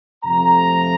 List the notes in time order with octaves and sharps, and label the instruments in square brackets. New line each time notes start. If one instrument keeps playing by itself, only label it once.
[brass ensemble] F2 C3 F3 A3 A#5